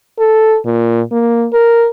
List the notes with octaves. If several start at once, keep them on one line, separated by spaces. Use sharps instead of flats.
A4
A#2
A#3
A#4